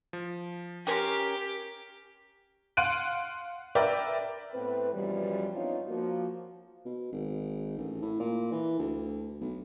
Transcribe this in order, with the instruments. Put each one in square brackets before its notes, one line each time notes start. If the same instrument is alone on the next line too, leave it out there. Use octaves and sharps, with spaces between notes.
[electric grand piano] F3
[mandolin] C#4 A#4 C6 [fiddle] G4 [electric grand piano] G5 G#5
[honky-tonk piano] F5 F#5 C6 F#6 D7 D#7
A#4 B4 D5 E5 G5
[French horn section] A2 B3 C4 B4
F#2 B2 E3 F3 G3
B3 C4 D4 D#4 F4 C#5
F3 A#3 F#4
[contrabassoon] B2
G#1
A1
A2
A#2
E3
D2
B1